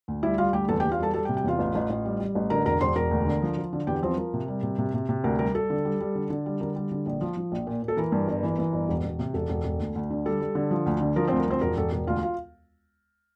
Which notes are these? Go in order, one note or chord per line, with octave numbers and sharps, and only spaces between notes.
D2
G3 E4 E5
G3 F4 F5
D2 G4 G5
E2 A4 A5
G4 G5
E2
F4 F5
G3 A4 A5
G3 A4 A5
G4 G5
C3
G4 G5
E2 F4 F5
A1
A1
A1
G3
G3
A1
D3 A#4 A#5
E1 A#4 A#5
E1 C5 C6
E1 A#4 A#5
D2
D3
F3
F3
D3
E2 G4 G5
F3 C4 C5
F3 A#4
C3
G3
C3
C3
C3
C3
D2 A#4
G3 A#4
G3 A4
D3
G3
G3
D3
D3
G3
D3 A#4
G3
D3
A#1
F3
F3
A#1
A#2
A#2
A4
E3 A#4
G2
G1
E3
E3
G1
E1
E1
C3
E1 A4
E1
E1
D2
D2
D3
G3 A4
G3
D3
F3
D2
D3
F3 A#4
C4 C5
D2
A#4
F3 C4 C5
E1 A#4
E1 A4
E1 A#4
D2 F4 F5
F4 F5